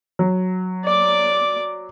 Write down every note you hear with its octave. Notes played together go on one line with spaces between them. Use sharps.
F#3
D5 D6